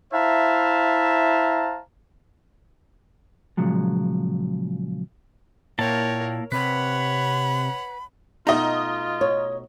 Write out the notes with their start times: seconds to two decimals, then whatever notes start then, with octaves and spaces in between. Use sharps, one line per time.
0.13 E4 C5 E5 F5 A5 A#5
3.57 A#2 C#3 F3 F#3 G#3
5.79 A#2 A#3 E4 A#4 C#5 G5 A5
6.52 C3 B4 C#5 F#5 B5
8.47 B2 A3 D#4 F4 D#5 A#5
9.21 C#5